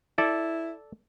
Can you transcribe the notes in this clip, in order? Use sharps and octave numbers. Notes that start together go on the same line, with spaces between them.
E4 A4 D5